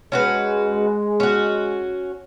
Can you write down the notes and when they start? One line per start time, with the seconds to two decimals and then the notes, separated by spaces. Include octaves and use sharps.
0.12 G#3 C#4 F#4 B4
1.20 C#4 F#4